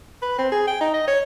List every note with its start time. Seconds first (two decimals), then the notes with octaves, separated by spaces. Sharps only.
0.22 B4
0.38 C4
0.52 G#4
0.67 G5
0.80 D#4
0.93 D#5
1.08 C#5